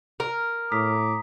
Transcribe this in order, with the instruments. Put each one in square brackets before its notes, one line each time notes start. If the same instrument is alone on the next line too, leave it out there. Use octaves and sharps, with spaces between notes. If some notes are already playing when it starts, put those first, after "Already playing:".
[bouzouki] A#4
[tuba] A2 [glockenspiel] A#5 D#6 B6 [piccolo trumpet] D6